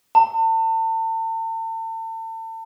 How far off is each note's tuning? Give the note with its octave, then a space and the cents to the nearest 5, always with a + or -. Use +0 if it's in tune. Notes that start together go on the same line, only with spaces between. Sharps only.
A5 +40